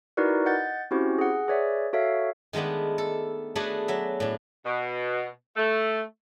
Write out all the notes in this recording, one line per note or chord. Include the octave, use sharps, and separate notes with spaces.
D#4 E4 F#4 A#4 B4 D5
D#5 F#5 G6 A6
C4 C#4 E4 F#4 G4 C5
G#4 F#5
G#4 B4 C#5 D5 E5
F#4 A4 C#5 E5 F5
D#3 G#3 A3 B3 D4
A4
A3 B3 D4 F#4 G#4
F#3 E5
A2 D4
B2
A3